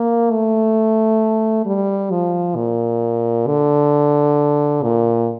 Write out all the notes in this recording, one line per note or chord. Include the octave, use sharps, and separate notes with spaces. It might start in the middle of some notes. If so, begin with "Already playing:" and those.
Already playing: A#3
A3
G3
F3
A#2
D3
A#2